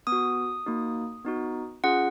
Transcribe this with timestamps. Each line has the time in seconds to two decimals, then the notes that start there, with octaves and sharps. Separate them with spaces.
0.07 B3 D#6
0.12 F#4
0.66 A#3 D#4 F#4
1.25 B3 D#4 F#4
1.84 C#4 F4 G#4 F#5